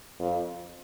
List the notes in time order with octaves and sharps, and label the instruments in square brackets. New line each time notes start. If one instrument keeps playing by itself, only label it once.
[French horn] F2